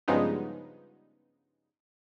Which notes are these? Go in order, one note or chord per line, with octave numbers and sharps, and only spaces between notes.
G2 C#3 F3 G#3 B3 D#4